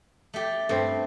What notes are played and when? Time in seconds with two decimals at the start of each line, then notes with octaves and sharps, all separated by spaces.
0.34 A3 G4
0.69 G2 A3 C4